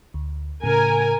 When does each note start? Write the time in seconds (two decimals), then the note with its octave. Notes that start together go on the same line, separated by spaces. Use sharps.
0.14 D2
0.64 A2 C#3 A#4 G#5